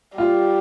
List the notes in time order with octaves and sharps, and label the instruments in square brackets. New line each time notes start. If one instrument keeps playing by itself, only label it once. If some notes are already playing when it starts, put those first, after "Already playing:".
[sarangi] G3 [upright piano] F4